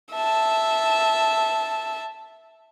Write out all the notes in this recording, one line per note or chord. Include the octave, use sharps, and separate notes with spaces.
E5 A5